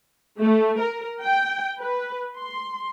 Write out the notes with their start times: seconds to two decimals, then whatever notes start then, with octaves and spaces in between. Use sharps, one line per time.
0.39 A3
0.78 A#4
1.21 G5
1.80 B4
2.36 C6